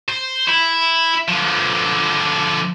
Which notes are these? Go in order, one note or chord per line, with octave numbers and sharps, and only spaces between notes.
C5
E4
D3 F3